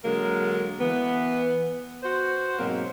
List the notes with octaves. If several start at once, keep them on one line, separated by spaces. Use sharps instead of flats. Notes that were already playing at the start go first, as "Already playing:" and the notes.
D3 F#3 G#3 A#3 A#4
E3 B3
F#4 C5
G#2 B2 F#3 A#3 C4